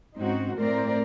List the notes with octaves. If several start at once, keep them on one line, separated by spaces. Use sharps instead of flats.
G#2 C4 C#4 D#4 F#4
A2 A3 C4 A#4 C5 D5